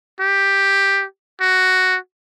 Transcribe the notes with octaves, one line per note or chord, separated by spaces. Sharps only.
G4
F#4